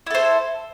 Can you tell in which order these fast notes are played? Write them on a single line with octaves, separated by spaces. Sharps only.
E4 A4 C5